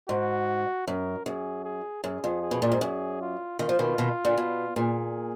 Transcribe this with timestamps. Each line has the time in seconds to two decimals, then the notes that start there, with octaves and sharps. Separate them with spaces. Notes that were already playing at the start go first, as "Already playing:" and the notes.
0.09 G#2 F#4
0.87 F#2 A#4
1.26 F#2 G#4
1.65 G#4
2.03 F#2 G#4
2.24 F2
2.42 G#4
2.51 B2
2.62 A#2
2.72 G#2
2.81 F#2
3.21 F4
3.59 D#3 F4
3.69 F3
3.79 B2 D#3
3.98 B2 D#3
4.25 A#2 D3
4.37 B2
4.76 A#2 G#4